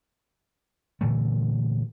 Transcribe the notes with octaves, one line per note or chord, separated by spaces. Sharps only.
A#2 D3 E3 A3